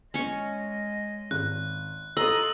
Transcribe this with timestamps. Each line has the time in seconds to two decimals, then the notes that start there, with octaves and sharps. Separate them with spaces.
0.14 G#3 C#4 D#5 C#6
1.31 G#1 F#6
2.17 F4 A4 D#5 A#5 E6 F#7